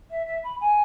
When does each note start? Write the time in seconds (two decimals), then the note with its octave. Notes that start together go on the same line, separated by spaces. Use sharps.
0.11 E5
0.27 E5
0.44 B5
0.61 G#5